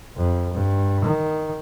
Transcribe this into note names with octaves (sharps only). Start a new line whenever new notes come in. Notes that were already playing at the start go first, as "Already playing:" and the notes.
F2
G2
D#3